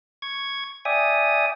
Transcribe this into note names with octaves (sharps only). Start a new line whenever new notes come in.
C#6 G#6
D5 E5 G5 G#5 D#6